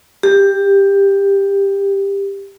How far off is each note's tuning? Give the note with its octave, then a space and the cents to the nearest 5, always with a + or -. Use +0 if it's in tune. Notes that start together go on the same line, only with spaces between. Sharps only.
G4 +15